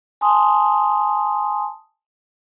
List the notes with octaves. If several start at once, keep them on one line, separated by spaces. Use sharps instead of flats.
G#5 A5 C6 D#6